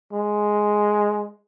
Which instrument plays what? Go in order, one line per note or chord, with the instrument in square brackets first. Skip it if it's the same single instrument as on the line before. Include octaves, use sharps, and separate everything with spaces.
[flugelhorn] G#3